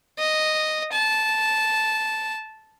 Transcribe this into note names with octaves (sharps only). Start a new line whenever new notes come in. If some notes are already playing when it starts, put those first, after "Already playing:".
D#5
A5